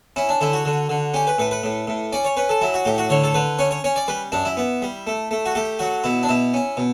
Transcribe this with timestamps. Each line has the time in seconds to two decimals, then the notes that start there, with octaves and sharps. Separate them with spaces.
0.16 C#4 E4
0.29 D4
0.41 D3 E4
0.53 F#4
0.65 D3
0.89 D3
1.14 C#4 G4
1.27 B4
1.38 A2 B4
1.51 B4
1.63 A2
1.87 A2
2.13 C#4 D5
2.24 C#5
2.37 C#4 B4
2.49 A4
2.61 F#3 E4
2.74 F#4
2.85 A2 G4
2.98 F#4
3.10 D3 C#5
3.24 A4
3.34 D3 B4
3.59 C#4 C#5
3.71 C#5
3.84 C#4 C#5
3.96 D5
4.08 G3 B4
4.32 F#2 D4
4.45 E4
4.57 B3
4.82 G3
5.07 A3
5.31 A3
5.45 F#4
5.55 A3 G4
5.79 F#3 F#4
6.04 B2 E4
6.23 D4
6.29 B2 E4
6.54 C#4
6.77 B2